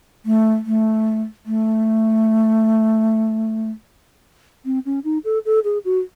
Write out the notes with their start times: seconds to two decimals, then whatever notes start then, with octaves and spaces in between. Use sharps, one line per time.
0.26 A3
0.66 A3
1.46 A3
4.65 C4
4.86 C#4
5.04 D#4
5.25 A4
5.45 A4
5.64 G#4
5.85 F#4